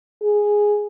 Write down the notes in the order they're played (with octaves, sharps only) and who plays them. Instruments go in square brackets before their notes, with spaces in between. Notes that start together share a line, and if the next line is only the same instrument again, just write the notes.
[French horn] G#4